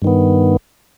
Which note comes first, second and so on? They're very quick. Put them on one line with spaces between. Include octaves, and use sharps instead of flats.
G2 D#3 B3